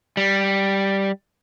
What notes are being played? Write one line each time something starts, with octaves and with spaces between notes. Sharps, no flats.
G3